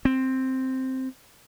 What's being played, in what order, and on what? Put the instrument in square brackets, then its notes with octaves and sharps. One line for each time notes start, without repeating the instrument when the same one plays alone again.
[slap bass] C4